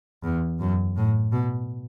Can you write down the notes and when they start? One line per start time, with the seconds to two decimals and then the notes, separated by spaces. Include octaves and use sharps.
0.24 E2
0.60 F#2
0.97 A2
1.32 B2